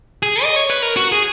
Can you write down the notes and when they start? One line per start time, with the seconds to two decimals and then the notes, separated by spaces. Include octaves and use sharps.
0.23 G#4
0.43 D#5
0.56 C#5
0.70 B4
0.82 A#4
0.97 F#4
1.12 G#4